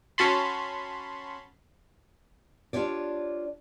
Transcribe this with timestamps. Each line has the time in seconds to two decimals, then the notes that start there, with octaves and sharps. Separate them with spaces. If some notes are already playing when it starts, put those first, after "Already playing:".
0.18 C#4 F#4 A5 B5 C6
2.73 D4 F4 G4 C#5 D5